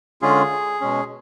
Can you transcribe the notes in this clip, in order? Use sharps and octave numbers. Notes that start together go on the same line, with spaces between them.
D3 G#3 C#4 F4 G#4
B2 G#3 C#4